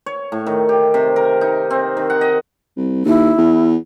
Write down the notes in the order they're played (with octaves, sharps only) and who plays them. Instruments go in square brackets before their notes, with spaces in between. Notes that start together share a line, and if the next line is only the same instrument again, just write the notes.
[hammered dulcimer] C#5
A2
D#3
G4
C3
A#4
D#4
C4
D#3
F#5
D#5
[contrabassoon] C2
[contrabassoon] D#2 [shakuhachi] E4
[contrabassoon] E2